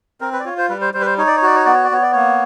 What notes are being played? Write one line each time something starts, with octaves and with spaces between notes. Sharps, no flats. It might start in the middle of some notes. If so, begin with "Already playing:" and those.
C4 A#4
B4
D5
F4 C#5
C5
G3 B4
C5
G3 C5
B4
C5
D#4 C#5
D5
C#5
F#4 D5
C#5
B3 D5
C#5
D5
B3 C#5
D5
A#3 C#5